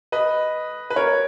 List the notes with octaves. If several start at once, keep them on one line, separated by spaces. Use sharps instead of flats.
B4 D#5
B4
A#4 C#5